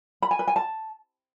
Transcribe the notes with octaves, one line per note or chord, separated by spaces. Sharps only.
B5
G#5
B4
G#5
A5